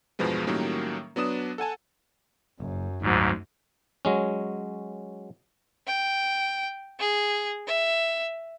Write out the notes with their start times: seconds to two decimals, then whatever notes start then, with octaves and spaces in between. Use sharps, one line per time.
0.19 E2 G2 B2 F3 G#3 B3
0.47 A2 D#3 F#3 G3 A#3 C#4
1.16 F#3 B3 D4 D#6 E7
1.58 A4 F#5 G#5 A5
2.60 F#1 F#2
3.02 G#1 D2 G#2 F#3
4.05 F#3 G#3 C#4
5.87 G5
7.00 G#4
7.67 E5